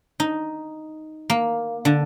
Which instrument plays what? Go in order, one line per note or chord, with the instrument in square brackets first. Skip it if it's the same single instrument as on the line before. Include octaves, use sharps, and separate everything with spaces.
[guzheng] D#4
A#3
D3